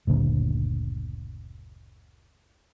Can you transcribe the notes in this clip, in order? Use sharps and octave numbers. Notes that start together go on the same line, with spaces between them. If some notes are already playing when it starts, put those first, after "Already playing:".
F#1 D2 A#2 D3